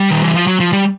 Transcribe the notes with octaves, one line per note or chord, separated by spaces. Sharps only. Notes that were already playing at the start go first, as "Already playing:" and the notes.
Already playing: G3
D#3
E3
F3
F#3
F3
G3